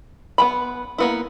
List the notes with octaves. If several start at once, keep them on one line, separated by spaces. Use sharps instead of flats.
B3 G5 B5
A#3 B3 E4